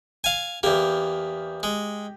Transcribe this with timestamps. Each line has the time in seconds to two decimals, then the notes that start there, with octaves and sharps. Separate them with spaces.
0.24 F5 G#5
0.63 E2 A#3 G4
1.63 G#3